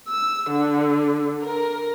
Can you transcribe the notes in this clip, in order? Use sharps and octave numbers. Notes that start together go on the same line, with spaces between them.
E6
D3
A#4